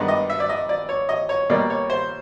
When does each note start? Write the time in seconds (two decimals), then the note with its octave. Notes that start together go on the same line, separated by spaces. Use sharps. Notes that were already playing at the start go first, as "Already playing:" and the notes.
Already playing: G2 D#3 G#3 B3 D#4 D5
0.08 D#5
0.30 E5
0.40 D5
0.49 D#5
0.69 D5
0.89 C#5
1.09 D#5
1.29 C#5
1.50 B2 G3 A#3 D#4 D5
1.70 C#5
1.90 C5